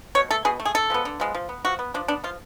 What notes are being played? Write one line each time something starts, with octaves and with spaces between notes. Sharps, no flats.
B2 C#5
A3 A4
B2 G#4
A3
G#4
D3 A4
F3 G#3 B3
D3
F3 G#3 B3
F3
B3
F3 F#4
B3
F3 D4
B3 D4
F3 F4